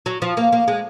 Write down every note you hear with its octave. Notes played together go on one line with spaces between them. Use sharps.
F#3
F3
A#3
A#3
G#3